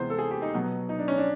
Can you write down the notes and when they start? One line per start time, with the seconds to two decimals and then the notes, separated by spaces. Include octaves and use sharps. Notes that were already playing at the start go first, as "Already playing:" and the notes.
Already playing: C3 E3 G#3 B3 C5
0.10 A4
0.19 G#4
0.31 G4
0.42 D#4
0.54 B2 F#3 B3
0.89 D#4
0.99 D4
1.08 C#4
1.18 D4